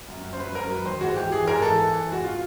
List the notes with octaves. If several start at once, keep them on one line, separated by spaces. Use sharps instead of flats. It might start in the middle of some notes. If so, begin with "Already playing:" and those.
F#2
F#2
C5
F#2 B4
F#2 A#4
F#3 B4
D#3 C5
G#2 F#4
E3 G4
E3 G#4
G#2 A#4
E3 A4
E3
E3
G#2 F#4
F4